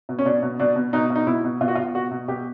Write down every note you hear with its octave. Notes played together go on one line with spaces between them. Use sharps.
B2
C#4
B2 D4
B2
B2 D4
B2
B2 D#4
B2
D#4
B2 E4
B2
B2 F4
F#4
B2 F4
B2 F#4
B2
B2 G4